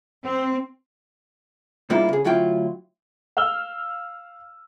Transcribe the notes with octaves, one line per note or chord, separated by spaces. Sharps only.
C4
G#2 G3 A#3 D4 E4 F4
C#3 G#4
D2 F#3 E4 F4 G5
F5 E6 F6 G7